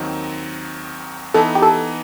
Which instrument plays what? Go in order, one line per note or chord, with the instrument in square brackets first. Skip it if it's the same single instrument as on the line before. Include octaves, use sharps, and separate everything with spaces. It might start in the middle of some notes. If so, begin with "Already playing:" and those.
Already playing: [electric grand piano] D#2 D#3 F#3 C4 D#4
[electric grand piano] E3 B3 D#4 [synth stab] A4
[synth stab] G4
A4